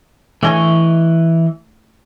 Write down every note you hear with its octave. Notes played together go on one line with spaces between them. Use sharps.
E3 A3 D#5 G#5 C#6